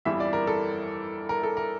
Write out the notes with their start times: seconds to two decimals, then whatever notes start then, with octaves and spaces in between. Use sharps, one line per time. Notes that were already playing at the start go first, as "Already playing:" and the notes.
0.05 G1 F2 E3 G3 E5
0.20 D5
0.33 A#4
0.47 A4
1.29 A#4
1.43 A4
1.57 A#4